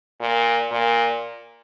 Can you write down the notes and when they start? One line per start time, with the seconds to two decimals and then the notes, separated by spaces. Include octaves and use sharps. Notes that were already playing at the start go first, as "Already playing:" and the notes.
0.21 A#2
0.71 A#2